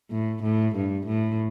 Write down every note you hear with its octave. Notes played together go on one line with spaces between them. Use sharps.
A2
A2
G2
A2